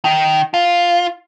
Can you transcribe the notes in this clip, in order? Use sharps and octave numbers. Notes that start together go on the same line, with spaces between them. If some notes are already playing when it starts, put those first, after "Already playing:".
D#3
F4